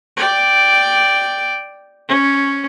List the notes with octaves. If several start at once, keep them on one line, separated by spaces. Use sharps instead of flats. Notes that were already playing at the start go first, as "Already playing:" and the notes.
D5 G5
C#4